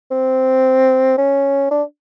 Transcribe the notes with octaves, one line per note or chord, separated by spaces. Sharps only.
C4
C#4
D4